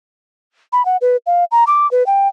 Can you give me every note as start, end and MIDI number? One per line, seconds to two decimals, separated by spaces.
0.73 0.85 83
0.85 0.97 78
1.01 1.17 71
1.26 1.44 77
1.52 1.64 82
1.67 1.89 86
1.91 2.06 71
2.07 2.28 79